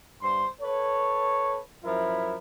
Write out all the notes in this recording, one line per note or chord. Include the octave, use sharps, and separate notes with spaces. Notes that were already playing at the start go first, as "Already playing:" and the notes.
G2 C5 C6
A4 B4 C#5
F#2 F3 E4 A#4 E5